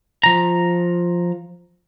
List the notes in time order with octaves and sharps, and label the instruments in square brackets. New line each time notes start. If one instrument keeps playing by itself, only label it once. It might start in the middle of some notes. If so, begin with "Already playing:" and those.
[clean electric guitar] F3 A#5